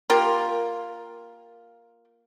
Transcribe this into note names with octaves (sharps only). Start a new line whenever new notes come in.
A#3 F4 G4 A#4